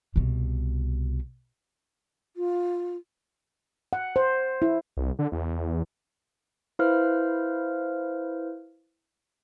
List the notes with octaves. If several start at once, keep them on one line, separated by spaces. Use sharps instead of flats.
C2 B2
F4
F#5
C5
E4
C2
D3
E2
E4 B4 C5 F5 F6